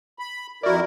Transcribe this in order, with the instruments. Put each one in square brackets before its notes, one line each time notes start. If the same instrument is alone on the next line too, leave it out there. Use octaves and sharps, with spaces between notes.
[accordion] B5
[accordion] F2 E4 A#4 [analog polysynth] F#4 D5